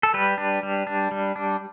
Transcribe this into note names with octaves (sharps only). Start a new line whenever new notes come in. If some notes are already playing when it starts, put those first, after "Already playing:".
A4
G3 B4
D4
G3
D4
G3
D4